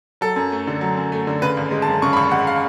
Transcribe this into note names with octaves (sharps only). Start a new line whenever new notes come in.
F#3 A4
F#2
A3
D3
F#3
F#2
A3
D3
C#3 B4
G#1
G#3
A5
F#2
C#3 C#6
B5
G#1 C#6
G#3 F#5
F5